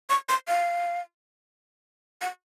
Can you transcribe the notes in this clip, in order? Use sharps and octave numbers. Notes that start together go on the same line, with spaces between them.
C#6
C6
F5
F#5